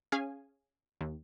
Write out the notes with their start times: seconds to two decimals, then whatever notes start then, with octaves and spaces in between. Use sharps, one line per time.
0.12 C#4 G#4 F5 G#5
1.01 D#2